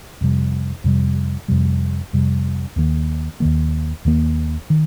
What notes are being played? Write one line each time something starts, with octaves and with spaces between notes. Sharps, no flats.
F2 C3 G3
F2 C3 G3
F2 C3 G3
F2 C3 G3
D#2 D#3 A#3
D#2 D#3 A#3
D#2 D#3 A#3
D#3